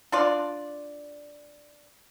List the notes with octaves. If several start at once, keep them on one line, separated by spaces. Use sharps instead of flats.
D4 F4 D5